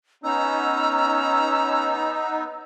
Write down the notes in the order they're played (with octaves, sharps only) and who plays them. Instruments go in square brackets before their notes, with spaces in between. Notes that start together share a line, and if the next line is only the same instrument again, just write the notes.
[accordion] B3 D#4 [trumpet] C#4 [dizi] A#5 [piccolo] E6